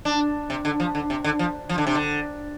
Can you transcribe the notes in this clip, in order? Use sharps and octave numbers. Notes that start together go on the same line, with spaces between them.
D4
C3
D3
F3
D3
C3
D3
F3
F3
D3
C3
D3